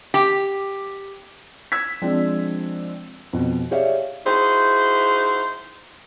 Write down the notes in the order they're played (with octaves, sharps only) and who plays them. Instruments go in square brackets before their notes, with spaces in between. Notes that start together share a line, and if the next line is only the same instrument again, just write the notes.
[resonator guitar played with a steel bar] G4
[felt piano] E6 G#6 B6
F3 G#3 C4 D4
F2 B2
G4 G#4 C#5 D5 E5 F5
[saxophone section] D#4 E4 F#4 G#4 C5